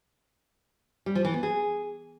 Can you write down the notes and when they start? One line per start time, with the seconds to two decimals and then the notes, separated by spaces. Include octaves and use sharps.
1.06 G3
1.15 F3
1.25 E3
1.34 B3
1.43 G#4